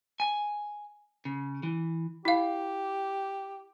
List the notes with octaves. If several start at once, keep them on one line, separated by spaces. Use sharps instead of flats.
G#5
C#3
E3
E4 G4 F5